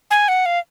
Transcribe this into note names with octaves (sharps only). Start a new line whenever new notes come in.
G#5
F#5
F5